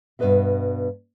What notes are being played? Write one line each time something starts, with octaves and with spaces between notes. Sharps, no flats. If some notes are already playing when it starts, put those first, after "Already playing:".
G2 B2 G#3 B4 D#5 E5